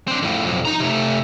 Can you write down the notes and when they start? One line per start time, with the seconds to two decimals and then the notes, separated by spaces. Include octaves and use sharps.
0.08 C4 D4
0.22 F2 A2
0.44 B1 F2
0.65 D#4 A#5
0.80 C3 A3